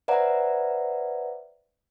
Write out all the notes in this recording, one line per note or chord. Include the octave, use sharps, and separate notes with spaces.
B4 C5 D5 E5 F#5 A#5